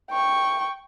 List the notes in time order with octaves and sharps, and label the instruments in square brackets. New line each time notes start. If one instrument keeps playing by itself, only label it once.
[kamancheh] G5 C#6